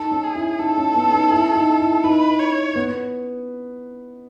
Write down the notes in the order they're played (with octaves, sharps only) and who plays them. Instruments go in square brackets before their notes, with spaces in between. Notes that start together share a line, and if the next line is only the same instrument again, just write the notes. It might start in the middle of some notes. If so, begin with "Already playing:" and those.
Already playing: [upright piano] D#4 [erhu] A4
[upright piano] C#4
[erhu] G#4
[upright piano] E4
[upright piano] D#4 [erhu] A4
[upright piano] C#4
B3
D#4
E4
D#4
E4
[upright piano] D#4 [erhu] B4
[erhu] C#5
[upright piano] B3